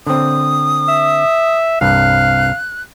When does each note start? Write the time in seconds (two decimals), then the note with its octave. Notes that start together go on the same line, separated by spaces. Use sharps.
0.07 D3 C4 D#6
0.89 E5
1.81 C2 G2 F5 F#6